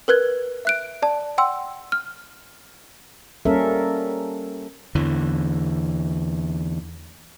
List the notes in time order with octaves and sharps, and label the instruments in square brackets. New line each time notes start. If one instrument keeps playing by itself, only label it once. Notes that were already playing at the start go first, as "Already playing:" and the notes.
[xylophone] A#4 B4 F#6 G#6
E5 F#6 D7
D5 A5
F#5 G5 C6 E6
F6
[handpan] G3 A#3 C#4 A4 A#4 E5
[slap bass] E2 D3 E3